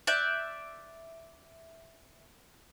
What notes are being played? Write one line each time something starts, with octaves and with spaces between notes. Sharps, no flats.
D5 E5 F#6 G6